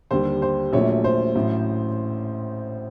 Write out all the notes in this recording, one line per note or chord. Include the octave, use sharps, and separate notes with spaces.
D#2 D3 G3 C5
C5
A#1 A#2 F#3 A3 C#5
C5
A1 A2 F#3